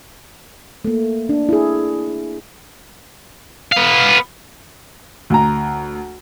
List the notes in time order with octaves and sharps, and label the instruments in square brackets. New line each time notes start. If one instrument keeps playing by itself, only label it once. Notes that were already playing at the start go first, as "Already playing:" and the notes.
[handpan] A3 A#3
D4
E4 G#4
[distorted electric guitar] B3 F5
[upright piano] D2 A#5